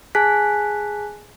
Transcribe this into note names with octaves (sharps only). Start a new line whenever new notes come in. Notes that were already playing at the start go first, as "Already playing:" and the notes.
G#4 G#5 A5 F#6 B6